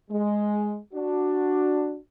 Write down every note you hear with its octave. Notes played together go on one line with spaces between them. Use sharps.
G#3
D4 F#4